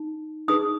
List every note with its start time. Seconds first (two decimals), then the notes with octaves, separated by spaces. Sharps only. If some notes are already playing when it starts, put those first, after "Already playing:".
Already playing: D#4
0.48 D#4 G#4 B4 D#6